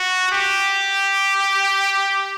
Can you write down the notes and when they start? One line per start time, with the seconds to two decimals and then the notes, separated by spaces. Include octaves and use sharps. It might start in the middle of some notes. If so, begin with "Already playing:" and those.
Already playing: F#4
0.32 G4